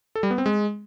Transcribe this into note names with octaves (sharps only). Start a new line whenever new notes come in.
A4
G3
B3
C4
G#3